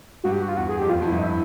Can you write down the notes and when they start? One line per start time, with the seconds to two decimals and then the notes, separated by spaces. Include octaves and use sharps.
0.24 G2 F#4
0.32 G4
0.41 F#4
0.49 F4
0.56 E2 F#4
0.69 G#4
0.79 F2 G4
0.89 E2 F4
1.02 F2 E4
1.12 G2
1.18 D#4
1.23 E4